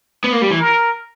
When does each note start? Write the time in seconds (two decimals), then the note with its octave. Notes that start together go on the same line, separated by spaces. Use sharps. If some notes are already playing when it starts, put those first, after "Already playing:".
0.24 B3
0.33 A#3
0.42 G3
0.50 E3
0.59 A#4